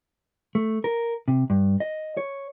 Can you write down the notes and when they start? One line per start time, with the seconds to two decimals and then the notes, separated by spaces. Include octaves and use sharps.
0.55 A3
0.84 A#4
1.28 C3
1.50 G2
1.80 D#5
2.17 C#5